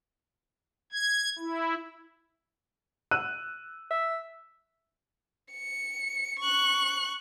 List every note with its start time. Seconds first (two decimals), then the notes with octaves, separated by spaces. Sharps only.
0.92 G#6
1.39 E4
3.11 E6 F#6 D#7
3.91 E5
5.52 C#7
6.40 C#6 F#6